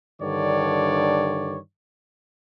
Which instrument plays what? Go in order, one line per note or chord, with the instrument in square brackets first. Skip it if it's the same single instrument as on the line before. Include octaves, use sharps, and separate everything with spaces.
[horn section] G2 D3 D#3 C#5 D5